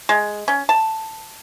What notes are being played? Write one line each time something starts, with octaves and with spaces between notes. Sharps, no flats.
G#3
C#4
A5